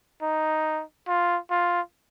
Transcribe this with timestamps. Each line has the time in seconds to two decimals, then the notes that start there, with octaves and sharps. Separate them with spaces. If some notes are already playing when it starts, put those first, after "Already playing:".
0.22 D#4
1.08 F4
1.51 F4